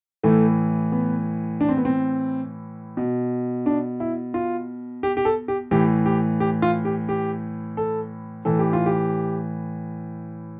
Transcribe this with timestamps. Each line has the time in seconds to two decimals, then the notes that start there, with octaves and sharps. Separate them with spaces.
0.23 A2 E3 A3
0.92 B3
1.61 D4
1.69 C4
1.77 B3
1.85 C4
2.97 B2
3.66 D4
4.00 E4
4.34 F4
5.03 G4
5.17 G4
5.25 A4
5.48 G4
5.71 A2 E3 G4
6.06 G4
6.40 G4
6.62 F4
6.85 G4
7.09 G4
7.77 A4
8.45 A2 E3 A4
8.59 G4
8.73 F4
8.86 G4